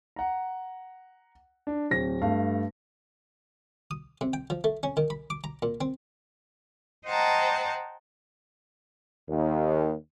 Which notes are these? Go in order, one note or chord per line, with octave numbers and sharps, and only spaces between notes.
F#5 A#5
D4
D1 C4 A#6
G2 A3 F5
D#6
C3
G5
F3
A3
C#4
D#3
B5
D6
A#5
A#2
C4
C5 D#5 F#5 G5 A5 A#5
D#2